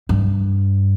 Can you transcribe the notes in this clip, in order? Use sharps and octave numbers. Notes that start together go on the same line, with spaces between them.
G2